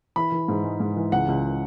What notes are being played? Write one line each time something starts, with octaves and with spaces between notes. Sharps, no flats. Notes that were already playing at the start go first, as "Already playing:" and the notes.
E3 B5
E3
G#2
G#3
G#2
E3
C#2 F#5
C#2